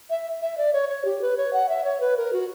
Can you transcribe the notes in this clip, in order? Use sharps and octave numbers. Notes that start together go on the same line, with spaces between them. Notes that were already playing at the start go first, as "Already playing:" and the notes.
E5
E5
D5
C#5
C#5
G4
B4
C#5
F#5
E5
C#5
B4
A#4
F#4